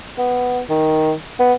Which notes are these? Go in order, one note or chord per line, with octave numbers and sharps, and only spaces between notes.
B3
D#3
B3